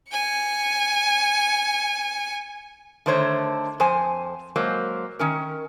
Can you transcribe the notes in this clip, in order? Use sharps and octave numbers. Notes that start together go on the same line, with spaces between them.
G#5 C#7
D3 D#3 A3 C5 C#5
F2 C5 G#5
F#3 G#3 A#3 C5
D#3 C#4 A#4